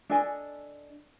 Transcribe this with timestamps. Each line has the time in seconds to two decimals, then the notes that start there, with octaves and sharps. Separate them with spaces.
0.09 D4 A4 D#5 G#5